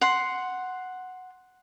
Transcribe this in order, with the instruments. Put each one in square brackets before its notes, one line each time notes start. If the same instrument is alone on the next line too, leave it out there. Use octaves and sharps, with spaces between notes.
[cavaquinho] F#5 C6